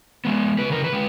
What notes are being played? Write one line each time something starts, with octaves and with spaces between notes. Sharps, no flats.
G#3 B3
C#3 B4
A#4
B4
G#3